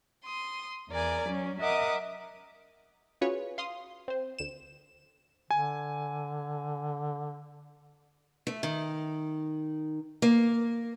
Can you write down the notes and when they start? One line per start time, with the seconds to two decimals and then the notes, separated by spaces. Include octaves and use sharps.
0.24 C6 D#6
0.89 E2 A#4 D5 G#5
1.27 F#3 C#4
1.60 A#4 D#5 E5 F#5 D6 D#6
3.21 C#4 F4 F#4 G#4 B4 C#5
3.58 F5 C6 D#6
4.08 C4 C5
4.39 D2 E7
5.51 D3 G#5
8.47 A3
8.63 D#3
10.22 A#3